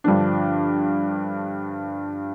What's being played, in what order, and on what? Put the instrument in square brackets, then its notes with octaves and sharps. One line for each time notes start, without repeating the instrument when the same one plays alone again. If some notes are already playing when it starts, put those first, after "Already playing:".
[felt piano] G2 D3 F3 D4